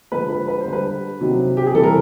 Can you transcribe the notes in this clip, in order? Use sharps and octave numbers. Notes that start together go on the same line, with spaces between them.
D3 F3 G#3 B4
B4
B4
C5
D3 G3
B4
C3 D#3 F#3
G4
G#4
C3 E3 G3 A4
A#4